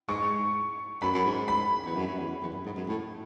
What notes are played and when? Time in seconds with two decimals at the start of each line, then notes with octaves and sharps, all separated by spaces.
0.09 G#2 C#6
1.02 F#2 B5
1.14 F#2
1.25 G#2
1.48 B5
1.85 E2
1.96 F#2
2.07 F#2
2.18 E2
2.42 E2
2.53 F#2
2.65 G#2
2.77 F#2
2.88 A2